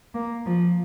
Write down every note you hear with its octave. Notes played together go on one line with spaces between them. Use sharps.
A#3
F3